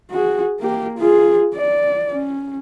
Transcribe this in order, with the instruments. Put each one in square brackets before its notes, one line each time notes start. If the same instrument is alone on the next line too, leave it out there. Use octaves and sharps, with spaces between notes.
[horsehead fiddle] F#4 G#4
A#3 G4
F4 G#4
D5
C#4